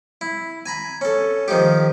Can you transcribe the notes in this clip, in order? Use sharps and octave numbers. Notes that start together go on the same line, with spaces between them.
E4
G#5 A#5 B5
C#4 A4
D#3 F3 D#4 G4